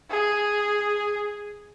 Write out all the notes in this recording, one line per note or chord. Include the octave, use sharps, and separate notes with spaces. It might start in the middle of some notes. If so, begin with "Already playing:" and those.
G#4